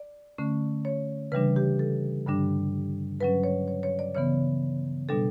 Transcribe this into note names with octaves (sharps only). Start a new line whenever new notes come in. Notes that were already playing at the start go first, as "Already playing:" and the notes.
Already playing: D5
D3 A3 C#4
C#5
C#3 E3 G3 D4 B4
G4
A4
G2 D3 G3 D4
G2 F#3 C#4 B4
C#5
C#5
C#5
D5
C#3 E3 B3 C#5
B2 G3 D4 A4